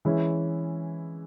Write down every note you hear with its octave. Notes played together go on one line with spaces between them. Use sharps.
E3 G#3 C#4 E4